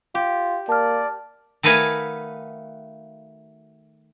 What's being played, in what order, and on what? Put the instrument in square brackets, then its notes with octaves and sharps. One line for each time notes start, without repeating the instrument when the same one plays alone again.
[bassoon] F4 [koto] G4
[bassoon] A#3 [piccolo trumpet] D5 [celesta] A5 F6
[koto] D#3 A3 F#4 B4 F5 G#5